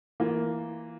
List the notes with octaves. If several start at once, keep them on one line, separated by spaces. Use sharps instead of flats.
E3 A#3 F4